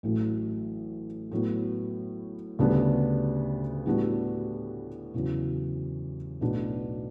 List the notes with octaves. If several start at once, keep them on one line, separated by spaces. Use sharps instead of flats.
A1 A2 F#3
A2 F#3 B3
D2 C#3 G3 B3 D4
A2 G3 B3 D4 F#4
E2 C#3 F#3
B1 A2 F#3 B3 D4